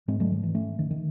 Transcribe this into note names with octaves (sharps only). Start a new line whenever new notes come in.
G#2 G#3 C4
F#3 A3
D#3
E3
A3 C#4
D#3
D#3